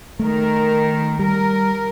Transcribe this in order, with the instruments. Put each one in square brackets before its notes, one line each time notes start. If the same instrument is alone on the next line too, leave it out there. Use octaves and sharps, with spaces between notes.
[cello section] D#3 A#4 [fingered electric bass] A3
[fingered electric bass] G3 [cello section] A#4